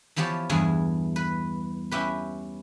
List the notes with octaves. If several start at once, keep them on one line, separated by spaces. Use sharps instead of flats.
E3 F3 B3 G4 C#5 A5
E2 G2 E3 G#4 G#5
B4
C#4 E4 G4 B4